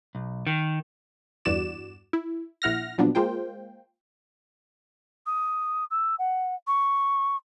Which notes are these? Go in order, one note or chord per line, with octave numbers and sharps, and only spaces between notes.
B1
D#3
E2 G2 E3 F#4 D5 E7
E4
A#1 E4 F#5 F6 A#6
A#2 F3 F#3 B3 D4
G#3 A#3 F4 C5 G5
D#6
E6
F#5
C#6